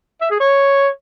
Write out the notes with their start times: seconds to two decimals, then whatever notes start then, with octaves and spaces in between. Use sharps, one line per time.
0.21 E5
0.31 G#4
0.40 C#5